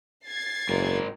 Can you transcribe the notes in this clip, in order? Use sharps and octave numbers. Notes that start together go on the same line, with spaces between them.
G#6 A6 C7
F#1 G#2 A#4